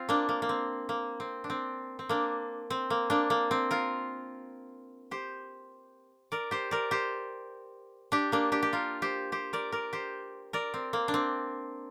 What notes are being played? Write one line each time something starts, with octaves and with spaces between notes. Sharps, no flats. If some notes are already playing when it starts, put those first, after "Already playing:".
Already playing: C4 F4
A#3 D4
A#3
A#3
C4
A#3
C4
D4
C4
C4
A#3 D4
C4
A#3
A#3 D4
A#3
C4
F4 A#4
G4 C5
A#4 D5
G4 C5
A#4 D5
G4 C5
D4 G4
A#3 D4
D4 G4
G4
F4 A#4
G4 C5
G4 C5
A#4 D5
A#4 D5
G4 C5
A#4 D5
C4
A#3
D4
C4